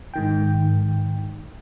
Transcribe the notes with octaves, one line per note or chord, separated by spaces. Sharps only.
G#2 D#3 G5